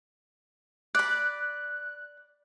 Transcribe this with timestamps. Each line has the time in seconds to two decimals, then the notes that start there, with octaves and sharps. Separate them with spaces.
0.95 D5 B5 F#6